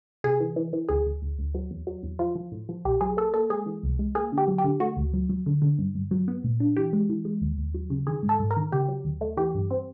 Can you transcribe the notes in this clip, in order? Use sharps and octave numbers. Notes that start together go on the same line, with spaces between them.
C3 G#4
E3
E3
E3
D2 G#4
D2
D2
D2
F#3
E2
F#3
E2
F3 F4
F3
A2
F3
B1 G4
F#3 G#4
A#3 A4
A#3 A4
G#3 G#4
E3
C2
G#3
A#3 G#4
D3
G4
F#3
G4
D3
A3 F#4
D2
F#3
F#3
D3
D3
G2
G2
F#3
B3
A#2
D4
E3 G4
G#3
E3
G#3
D#2
D#2
F#3
C#3
D#3 G#4
G#2
A4
G#2
A#4
D#3
C#3 G4
F#3
D#2
A3
E3 G4
G2
C4